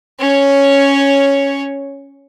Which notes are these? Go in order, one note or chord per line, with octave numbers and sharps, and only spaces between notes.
C#4 C#5